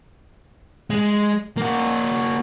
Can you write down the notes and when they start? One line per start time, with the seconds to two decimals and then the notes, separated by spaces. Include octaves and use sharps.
0.90 G#3
1.57 A#3 F#4